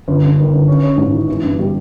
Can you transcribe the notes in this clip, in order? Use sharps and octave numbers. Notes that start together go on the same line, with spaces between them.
G1
G2
D#3
G1
C#4
C#4
G#2
E3
E3
G2
G3